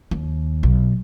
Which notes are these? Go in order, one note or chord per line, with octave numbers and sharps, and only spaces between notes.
D#2
B1